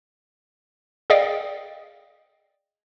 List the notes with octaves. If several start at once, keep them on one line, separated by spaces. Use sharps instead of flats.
G#4 D5 D#5 F5 G5